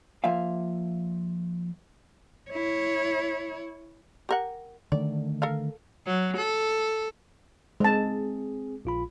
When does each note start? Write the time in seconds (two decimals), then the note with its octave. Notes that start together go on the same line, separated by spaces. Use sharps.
0.24 F3 A#3 F4 E5 F5
2.50 E4 C#5
4.29 G4 A#4 F#5
4.92 D3 D#3 A3 D5
5.42 A4 A#4 F5
6.06 F#3
6.37 A4
7.80 G#3 C4 G#4 A5
8.85 A#1 F4 B5